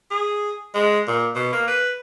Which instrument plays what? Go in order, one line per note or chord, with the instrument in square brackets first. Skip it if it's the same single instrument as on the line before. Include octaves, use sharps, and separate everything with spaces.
[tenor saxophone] G#4
G#3
A#2
B2
A#3
B4